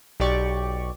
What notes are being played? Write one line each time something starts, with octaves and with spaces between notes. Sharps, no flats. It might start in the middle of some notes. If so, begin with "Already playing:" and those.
B1 G4 D5 C#6